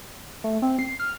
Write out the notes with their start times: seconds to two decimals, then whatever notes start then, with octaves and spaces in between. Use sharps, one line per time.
0.44 A3
0.62 C4
0.79 C7
1.00 F6